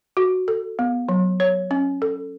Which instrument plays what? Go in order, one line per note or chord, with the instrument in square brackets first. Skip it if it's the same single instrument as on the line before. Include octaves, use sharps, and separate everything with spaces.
[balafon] F#4
A4
B3
F#3
C#5
C#4
A4